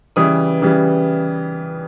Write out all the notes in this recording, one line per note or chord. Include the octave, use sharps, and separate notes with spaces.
C#3 E3 G3 D#6
C#3 E3 G3